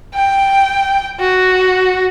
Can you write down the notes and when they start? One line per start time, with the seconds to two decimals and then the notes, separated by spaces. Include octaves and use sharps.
0.14 G5
1.20 F#4